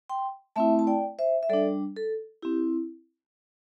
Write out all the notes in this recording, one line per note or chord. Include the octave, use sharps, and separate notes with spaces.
G5 C6
A3 C4 E4 E5 A5
A5
D5 G5
C5 E5
E5
G3 D4 A4 D5
A4
C4 E4 G4